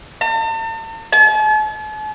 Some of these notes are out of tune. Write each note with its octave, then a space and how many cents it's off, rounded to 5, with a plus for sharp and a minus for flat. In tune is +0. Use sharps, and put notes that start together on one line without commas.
A5 +45
A5 -45